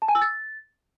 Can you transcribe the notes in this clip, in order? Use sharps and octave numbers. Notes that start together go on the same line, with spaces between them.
A5
G#5
E6
A6